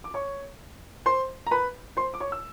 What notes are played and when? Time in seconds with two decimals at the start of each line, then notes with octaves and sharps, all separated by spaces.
0.04 D6
0.14 C#5 C#6
1.06 C5 C6
1.47 A#5
1.51 B4 B5
1.97 C5 C6
2.14 D6
2.20 C#5 C#6
2.32 E6